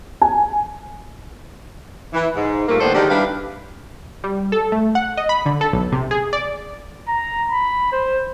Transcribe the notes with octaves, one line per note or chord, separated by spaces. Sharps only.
G#5
E3
G#2
A#2 G3 A3 A#3
D#2 A2 B3 D4 A4 C5
D3 D#3 F#3 G#3 D4 G4
G3 D4 E4 G4 B4 F5
G3
A4
A3
F#5
D#5
B5
D3
A4
B1
C3
G#4
D5
A#5
B5
C5